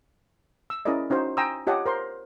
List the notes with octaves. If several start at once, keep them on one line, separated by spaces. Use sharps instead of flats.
E6
C#4 E4 G#4 A#4 D5 D#5
C#4 D#4 F#4 C5
G5 G#5 A#5 C6 D#6 E6
F4 G4 C#5 D#5 F#5 A5
A#4 C5 C6